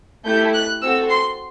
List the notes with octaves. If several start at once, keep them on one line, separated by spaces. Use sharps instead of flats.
A3 E4 G4 G6
F#6
C4 F#4 A4 E6
C6